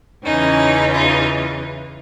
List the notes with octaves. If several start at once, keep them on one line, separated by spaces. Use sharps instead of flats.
E2 C#3 E3 C#4 D#4
D#4 F4